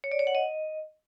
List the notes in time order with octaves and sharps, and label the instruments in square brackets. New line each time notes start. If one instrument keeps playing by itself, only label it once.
[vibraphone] C#5
D5
C#5
F#5
D#5